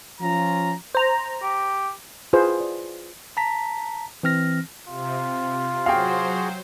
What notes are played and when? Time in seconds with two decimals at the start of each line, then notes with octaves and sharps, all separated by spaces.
0.21 F3 C#4 F4 A#5
0.95 C5 A#5
1.42 G4
2.33 E4 F4 G#4 B4 C5
2.60 D5
3.37 A5 A#5 B6
4.23 E3 C4 F6 A#6
4.87 C3 F4
5.86 F#3 F#4 G#4 C5 F5 G5